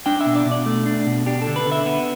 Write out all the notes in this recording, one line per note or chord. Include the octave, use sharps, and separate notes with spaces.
D4 G5
E5
B2
D5
B2
D5
A3
D4
B2
D4 G4
A4
D3
B4
D3
E5
B3